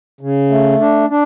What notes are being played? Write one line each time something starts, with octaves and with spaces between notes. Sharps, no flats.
C#3
A3
D4
D4